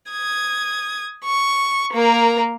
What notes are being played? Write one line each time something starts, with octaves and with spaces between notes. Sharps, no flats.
D#6 G#6
C#6
A#3 A#4